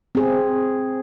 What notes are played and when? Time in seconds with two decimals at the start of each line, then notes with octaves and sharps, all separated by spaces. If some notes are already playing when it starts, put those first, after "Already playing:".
0.15 C4 G#4